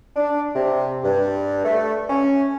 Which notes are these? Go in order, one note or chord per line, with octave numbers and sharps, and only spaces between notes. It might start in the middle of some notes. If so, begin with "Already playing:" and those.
D4
C3
G2
A3
C#4